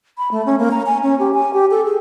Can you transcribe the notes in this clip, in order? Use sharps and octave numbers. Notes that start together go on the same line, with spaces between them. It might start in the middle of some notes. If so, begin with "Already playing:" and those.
B5
A3
C#4
A#3
A#5
G#5
C#4
G4
G#5
G4
A4
G#4